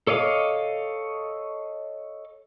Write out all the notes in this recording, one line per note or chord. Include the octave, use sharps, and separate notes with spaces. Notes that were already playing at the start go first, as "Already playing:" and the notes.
A4 C#5 D#5 F5 D6